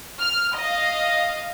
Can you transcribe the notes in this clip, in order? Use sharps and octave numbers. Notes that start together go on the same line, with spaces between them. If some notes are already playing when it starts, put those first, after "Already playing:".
F6
D#5 F5